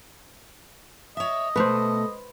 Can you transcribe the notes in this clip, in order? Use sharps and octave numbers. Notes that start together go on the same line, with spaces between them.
C#5 D#5 E5
B2 A3 B4 C5